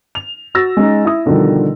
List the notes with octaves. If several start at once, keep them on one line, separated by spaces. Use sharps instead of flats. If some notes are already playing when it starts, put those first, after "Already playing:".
F7
F#4 E6 A6 A#6
G#3 C#4 D#4
E4 D#6
B2 D3 D#3 F3 G3